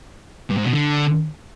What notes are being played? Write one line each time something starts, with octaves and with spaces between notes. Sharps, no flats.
G2
G#2
B2
D3